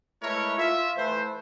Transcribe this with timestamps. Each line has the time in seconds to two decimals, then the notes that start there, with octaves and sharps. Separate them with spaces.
0.22 G#3 A3 E4 A#4 B4 C#5
0.58 F4 E5
0.97 E3 A3 B4 C5